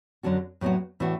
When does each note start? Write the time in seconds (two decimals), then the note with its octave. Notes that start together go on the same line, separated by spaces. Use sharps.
0.23 F#2 D3 F#3 D4 F#4
0.61 A2 F#3 B3 D4 F#4
1.00 A2 E3 D4 F#4